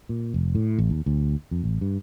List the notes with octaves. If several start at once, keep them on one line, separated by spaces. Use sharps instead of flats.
A#2
F1
A2
A1
D#2
D2
F2
A1
G2